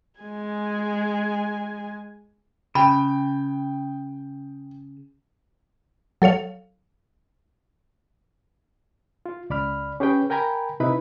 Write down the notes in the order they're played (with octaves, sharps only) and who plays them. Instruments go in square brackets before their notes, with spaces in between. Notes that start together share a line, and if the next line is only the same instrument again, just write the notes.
[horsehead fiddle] G#3 G#5
[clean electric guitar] C#3 [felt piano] G5 [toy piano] B5
[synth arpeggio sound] F#3 A4 C#5 F5
[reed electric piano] F4
C#2 D5 B5 F6
C#4 G4 G#4 B4 G5
A#4 G5 G#5 A#5 B5
C3 D#4 E4 B4 B5